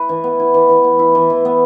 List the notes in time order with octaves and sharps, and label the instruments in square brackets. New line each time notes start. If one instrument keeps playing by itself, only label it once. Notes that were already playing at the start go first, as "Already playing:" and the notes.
Already playing: [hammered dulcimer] E4 B4
E3
B3
E4
E3
E3
B3
E4
E3
E3
B3